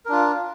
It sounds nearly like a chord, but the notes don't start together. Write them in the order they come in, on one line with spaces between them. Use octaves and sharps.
A#4 D4 F4